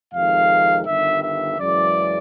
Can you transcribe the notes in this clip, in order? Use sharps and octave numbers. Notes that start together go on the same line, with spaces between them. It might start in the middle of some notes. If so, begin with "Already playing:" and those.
F2 C3 D#3 G#3 F5
G1 G2 D#3 E5
E5
F#2 C#3 E3 G#3 D5